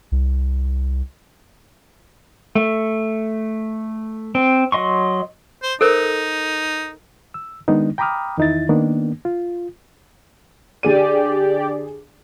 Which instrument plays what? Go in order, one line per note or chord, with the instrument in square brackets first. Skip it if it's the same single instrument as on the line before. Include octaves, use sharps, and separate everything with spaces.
[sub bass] C2
[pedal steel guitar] A3
C4
F#3 D#5 C6 C#6
[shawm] C5
[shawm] D#4 [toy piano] A4 A#4 C5
[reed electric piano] E6
D#3 G#3 B3 D4 D#4
G5 A#5 B5 D6 D#6 F6
E2 D#3 D#4 E4 A6
D#3 A#3 B3 D4
F4
[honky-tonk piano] D3 G#4 D#7 [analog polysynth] G4 D5